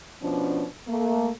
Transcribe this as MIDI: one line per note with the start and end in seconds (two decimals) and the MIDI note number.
0.22 0.65 47
0.22 0.65 53
0.22 0.65 61
0.22 0.65 62
0.87 1.29 57
0.87 1.29 58